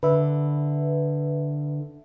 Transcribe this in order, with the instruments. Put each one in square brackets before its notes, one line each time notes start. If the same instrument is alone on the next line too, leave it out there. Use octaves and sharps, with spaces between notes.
[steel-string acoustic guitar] D3 [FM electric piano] B4 E5